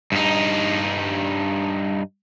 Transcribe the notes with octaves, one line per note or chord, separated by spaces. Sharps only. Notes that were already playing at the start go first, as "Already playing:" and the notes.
G2 D#4